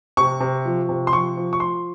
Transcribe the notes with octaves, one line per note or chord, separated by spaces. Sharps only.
C3 C#6
C3
F3
C3
C6
F3 C#6
F3
C#6
F3 C6